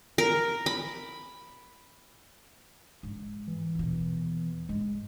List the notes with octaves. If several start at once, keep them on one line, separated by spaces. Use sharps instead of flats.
A#4
B5
G#2
E3
D#2 B2
G#2 G#3